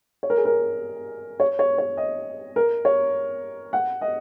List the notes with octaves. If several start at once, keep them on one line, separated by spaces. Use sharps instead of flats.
C#5
A#4
G#4
A#4
C#5
C#5
C#5
D#5
A#4
C#5
F#5
D#5